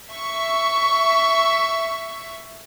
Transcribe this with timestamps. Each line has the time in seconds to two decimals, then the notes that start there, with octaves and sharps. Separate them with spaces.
0.11 E5 C#6